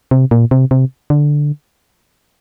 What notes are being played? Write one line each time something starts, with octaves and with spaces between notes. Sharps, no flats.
C3
A#2
C3
C3
D3